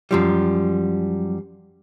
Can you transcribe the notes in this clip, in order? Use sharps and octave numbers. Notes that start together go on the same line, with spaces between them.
F#2 F3 G3